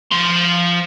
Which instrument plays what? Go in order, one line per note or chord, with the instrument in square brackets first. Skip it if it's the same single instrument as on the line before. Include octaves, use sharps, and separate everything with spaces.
[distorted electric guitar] F3 C6